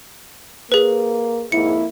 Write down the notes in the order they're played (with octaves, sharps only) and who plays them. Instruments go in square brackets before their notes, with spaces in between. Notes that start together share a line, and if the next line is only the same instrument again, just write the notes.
[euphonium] A#3 [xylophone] G#4 B4
[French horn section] F2 A#3 E4 [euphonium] G#2 [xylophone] C#7